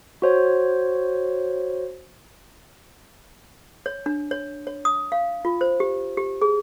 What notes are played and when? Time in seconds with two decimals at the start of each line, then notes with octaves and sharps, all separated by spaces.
0.22 F#4 C5 C#5
3.86 C#5
4.06 D4
4.31 C#5
4.67 C#5
4.85 D#6
5.12 F5
5.45 F4
5.61 C5
5.80 G4
6.17 G4
6.42 G#4